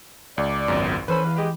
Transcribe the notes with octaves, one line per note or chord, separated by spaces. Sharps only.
C#2 D5
G#1 C#2 F#2 B3
E3 C#4 A4 B4 C5 B5
E2 F5
G#3 G4